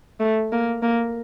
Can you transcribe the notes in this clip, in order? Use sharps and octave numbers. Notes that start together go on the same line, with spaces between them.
A3
A#3
A#3